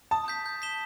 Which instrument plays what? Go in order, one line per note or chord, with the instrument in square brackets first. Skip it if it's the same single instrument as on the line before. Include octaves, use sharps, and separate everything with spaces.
[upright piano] A5 [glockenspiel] D#6
[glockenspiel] G6 B6
G6
B6 E7 G7